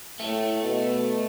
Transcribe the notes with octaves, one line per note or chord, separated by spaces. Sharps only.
A2 A3
B2